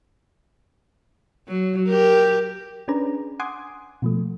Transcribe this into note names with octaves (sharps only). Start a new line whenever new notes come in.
F#3
G4 A#4
C#4 D4 G#4 B4 D5 A#5
F#5 G#5 C6 D6 D#6 G#6
B2 F3 A3